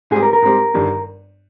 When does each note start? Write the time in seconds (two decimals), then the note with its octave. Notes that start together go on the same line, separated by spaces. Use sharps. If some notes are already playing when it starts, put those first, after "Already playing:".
0.11 G#2 G3 C4 G4 G#4
0.23 A#4
0.33 A#4
0.42 G#2 G3 C4 G4
0.74 G1 G2 D#3 G3